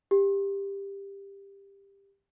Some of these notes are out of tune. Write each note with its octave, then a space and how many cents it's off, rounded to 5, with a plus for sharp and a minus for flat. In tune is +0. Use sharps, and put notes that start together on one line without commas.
G4 +15